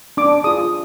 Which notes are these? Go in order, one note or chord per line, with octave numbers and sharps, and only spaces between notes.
D4 D6
F4 G#4 D#6